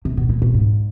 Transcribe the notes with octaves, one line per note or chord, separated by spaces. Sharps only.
C3
B2
A#2
A#2
G#2